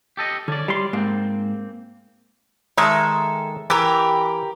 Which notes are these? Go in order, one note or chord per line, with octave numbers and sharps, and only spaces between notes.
G4 A4 D#5
D3 C#4 D5
G3 C6
G#2 A#3 C4
D#3 G#3 A4 E5
E3 G4 A#4